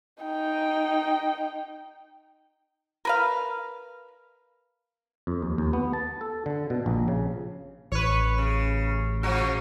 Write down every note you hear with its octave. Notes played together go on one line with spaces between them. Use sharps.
D#4 G5
A#4 B4 F5
F2
D#2
D#2
B3
A5
A4
D3
B2
A#1
C#3
A1 B4 C#5
C#3
C#3 F3 F#4